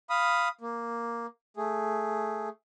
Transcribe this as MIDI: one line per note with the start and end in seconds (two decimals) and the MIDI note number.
0.10 0.49 77
0.10 0.49 83
0.10 0.49 87
0.61 1.27 58
1.57 2.49 57
1.57 2.49 68